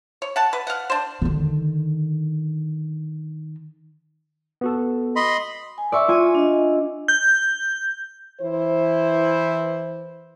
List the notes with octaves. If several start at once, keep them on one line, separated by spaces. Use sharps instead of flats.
C#5
F#5 A5
B4
F5 F#5
D4 C5
D3 D#3
B3 F#4 A4
D#5 B5 C6
G#5
D5 E5 C6 C#6
F4 G#5 D#7
D4 D#5
G6
E3 E4 C5